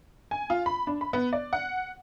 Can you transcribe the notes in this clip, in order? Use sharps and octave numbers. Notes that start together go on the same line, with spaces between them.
G#5
F4
B5
D4
B5
B3
D5
F#5